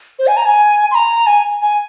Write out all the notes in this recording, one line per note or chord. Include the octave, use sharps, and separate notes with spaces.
C5
G#5
A#5
G#5
C6
A#5
G#5
G#5